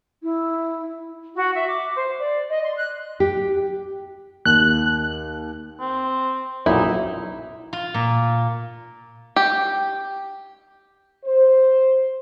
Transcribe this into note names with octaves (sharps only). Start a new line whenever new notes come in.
E4
F#4
E5
D6
C5
D5
D#5
C6
F#6
G4
D#2 F#6
C4
B1 F#2 A#2 D#4 E4
F4
A#2
G4
C5